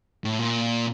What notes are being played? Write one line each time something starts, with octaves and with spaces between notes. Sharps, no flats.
A2
A#2